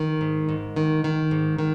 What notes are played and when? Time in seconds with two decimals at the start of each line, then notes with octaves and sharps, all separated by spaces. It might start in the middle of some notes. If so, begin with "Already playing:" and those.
Already playing: D#3
0.21 G#2
0.49 G#2
0.76 D#3
1.04 D#3
1.31 G#2
1.59 D#3